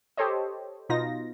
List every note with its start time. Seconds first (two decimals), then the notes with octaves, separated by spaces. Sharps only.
0.17 G4 A4 C5 C#5 D#5
0.89 B2 D#4 F4 A#6